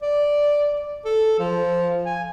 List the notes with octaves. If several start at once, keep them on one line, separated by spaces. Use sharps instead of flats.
D5
A4
F3
G#5